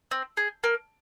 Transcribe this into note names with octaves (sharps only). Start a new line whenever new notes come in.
C4
G#4
A#3